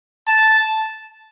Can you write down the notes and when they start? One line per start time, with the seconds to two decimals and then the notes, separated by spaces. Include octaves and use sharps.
0.27 A5